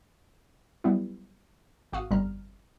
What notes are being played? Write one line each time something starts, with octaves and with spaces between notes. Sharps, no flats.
F#2 G3 B3 E4
G#1 F#4 F5 D#6
G1 F2 G3 A#5 F6